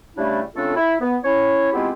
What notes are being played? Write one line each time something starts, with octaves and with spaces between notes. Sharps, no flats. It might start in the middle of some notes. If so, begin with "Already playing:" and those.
C#3 G3 A3 D4 E4
C#3 A3 C4 D4 F4 A4
E4
B3
C#4 E4 C#5
G#3 B3 C4 E4 F4 G4